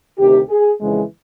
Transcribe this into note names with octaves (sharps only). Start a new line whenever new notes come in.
D2 C3 D#3 G4
G#4
F2 C#3 E3 G#3